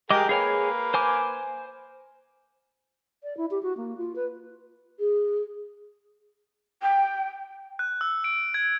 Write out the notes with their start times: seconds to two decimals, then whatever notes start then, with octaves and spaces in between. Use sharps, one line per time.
0.10 G#3 G4 G#4 A#4 D#5 D6
0.29 A#3 G#4 B4 C#5 G#5
0.94 C5 G#5 D6
3.23 D5
3.37 E4
3.51 G4
3.63 F#4
3.77 A#3
3.98 F4
4.16 B4
4.99 G#4
6.82 G5
7.79 F#6
8.01 E6
8.24 D7
8.54 G#6